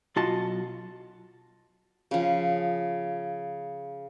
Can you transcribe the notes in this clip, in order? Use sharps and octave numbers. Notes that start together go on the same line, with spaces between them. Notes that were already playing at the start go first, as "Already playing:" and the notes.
B1 F4 F#4 D#5 A5
C#3 F3